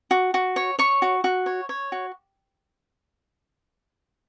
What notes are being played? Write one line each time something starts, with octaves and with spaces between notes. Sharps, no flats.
F#4
F#4
C#5
C#5 C#6
F#4
F#4
C#5
C#5
F#4